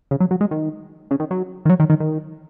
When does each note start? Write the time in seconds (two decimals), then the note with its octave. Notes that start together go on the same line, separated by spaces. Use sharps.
0.11 C#3
0.20 F#3
0.31 F#3
0.41 G#3
0.51 D#3
1.11 C#3
1.20 D#3
1.31 F#3
1.65 D#3
1.69 F#3
1.80 D#3
1.90 D#3
2.00 D#3